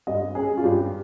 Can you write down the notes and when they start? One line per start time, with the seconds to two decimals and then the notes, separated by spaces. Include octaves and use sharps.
0.07 G2 D#5
0.35 C#4 G#4
0.57 F4
0.63 G2 G4